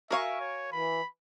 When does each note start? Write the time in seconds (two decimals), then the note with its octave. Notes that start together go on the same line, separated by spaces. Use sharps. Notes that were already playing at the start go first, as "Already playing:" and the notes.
0.11 F#4 A#4 E5 F5 G#5 C#6
0.40 C#5
0.72 E3 B5